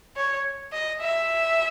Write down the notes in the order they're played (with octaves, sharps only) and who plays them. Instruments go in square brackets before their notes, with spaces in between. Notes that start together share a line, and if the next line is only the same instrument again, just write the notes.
[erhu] C#5
D#5
E5